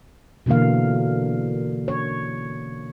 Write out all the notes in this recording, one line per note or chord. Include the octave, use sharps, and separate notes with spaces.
B2 D3 E3 A#3 F5
C#5